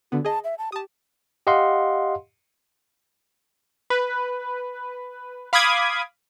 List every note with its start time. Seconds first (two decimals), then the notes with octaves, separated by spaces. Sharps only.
0.12 D3 B3 F#4
0.25 G#4 D#5 A5
0.44 E5
0.58 A5
0.72 G4 A5 D#6
1.47 G4 D#5 F5 F#5 C6
3.90 B4
5.53 F5 B5 D6 D#6 G#6